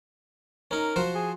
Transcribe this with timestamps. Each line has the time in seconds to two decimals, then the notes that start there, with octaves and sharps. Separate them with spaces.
0.71 C#4 D#4 A#4
0.96 F3 F#4 C5
1.15 G#4